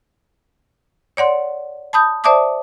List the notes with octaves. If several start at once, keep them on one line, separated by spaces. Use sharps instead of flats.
C#5 D5 F#5 C6
A5 B5 D#6 G6
C5 D5 E5 A5 D6 D#6